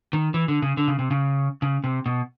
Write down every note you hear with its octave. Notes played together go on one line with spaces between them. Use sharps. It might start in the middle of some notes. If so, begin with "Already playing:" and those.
D#3
E3
D3
C#3
D3
C#3
C3
C#3
C#3
C3
B2